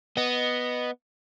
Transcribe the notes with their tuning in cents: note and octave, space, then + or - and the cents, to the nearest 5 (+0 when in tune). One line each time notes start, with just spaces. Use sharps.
B3 +0 D#5 -5